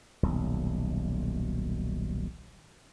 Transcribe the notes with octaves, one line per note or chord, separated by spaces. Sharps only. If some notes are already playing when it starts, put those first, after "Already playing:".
D#1 B1